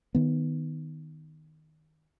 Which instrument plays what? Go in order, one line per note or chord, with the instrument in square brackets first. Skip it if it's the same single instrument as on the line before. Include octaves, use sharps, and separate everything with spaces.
[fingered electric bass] D#3 B3